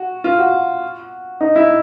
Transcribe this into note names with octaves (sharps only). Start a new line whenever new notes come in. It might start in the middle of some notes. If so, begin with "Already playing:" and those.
Already playing: F#4
F4
F#4
D#4
E4